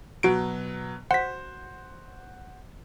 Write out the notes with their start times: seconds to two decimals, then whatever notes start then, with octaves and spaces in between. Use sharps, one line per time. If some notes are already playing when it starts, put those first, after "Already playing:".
0.23 B2 F#3 F#4 D7
1.11 F#4 C5 F#5 B6